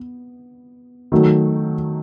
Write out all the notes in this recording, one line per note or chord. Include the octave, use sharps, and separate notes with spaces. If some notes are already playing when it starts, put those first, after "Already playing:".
Already playing: B3
D#3 F#3 A3